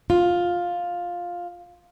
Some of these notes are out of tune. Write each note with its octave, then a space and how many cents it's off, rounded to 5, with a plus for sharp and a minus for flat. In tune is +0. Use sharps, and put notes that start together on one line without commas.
F4 +10